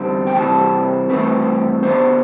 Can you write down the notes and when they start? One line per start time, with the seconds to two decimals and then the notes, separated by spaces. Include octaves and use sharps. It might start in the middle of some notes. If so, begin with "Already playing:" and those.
Already playing: E2 D3 G3 C4
0.27 G5
0.35 C3 E3 G3 C4 A5
1.09 G2 E3 A3 C4 B4
1.83 B2 B3 D4 C5